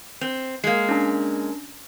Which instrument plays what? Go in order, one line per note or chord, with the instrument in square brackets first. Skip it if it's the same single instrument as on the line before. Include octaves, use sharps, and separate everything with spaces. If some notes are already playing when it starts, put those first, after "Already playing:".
[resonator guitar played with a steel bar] C4
[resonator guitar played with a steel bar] G#3 A#3 [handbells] C7
[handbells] C#4 D4